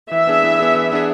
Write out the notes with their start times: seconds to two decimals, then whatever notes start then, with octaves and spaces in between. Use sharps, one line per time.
0.11 E3 E5
0.27 B3 D4 G#4
0.44 E3
0.60 B3 D4 G#4
0.75 E3
0.92 B3 D4 G#4